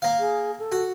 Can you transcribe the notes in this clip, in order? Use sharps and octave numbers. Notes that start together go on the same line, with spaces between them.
A#3 F5
G#4
A4
F#4